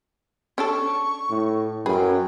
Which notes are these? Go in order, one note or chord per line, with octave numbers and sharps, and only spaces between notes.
C#4 D4 A4 C#6
A2
F#2 G#4 B4 G5